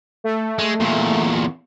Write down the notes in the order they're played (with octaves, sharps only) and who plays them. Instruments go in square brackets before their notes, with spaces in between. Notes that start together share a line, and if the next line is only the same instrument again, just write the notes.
[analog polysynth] A3
[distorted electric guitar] G#3
E2 A#2